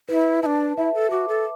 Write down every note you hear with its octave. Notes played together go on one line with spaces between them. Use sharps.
E4 B4
D4 E4 A5
E4 E5
A4
F#4 D6
A4